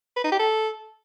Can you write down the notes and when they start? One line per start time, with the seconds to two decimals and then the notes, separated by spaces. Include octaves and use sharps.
0.17 B4
0.24 D#4
0.32 G4
0.40 A4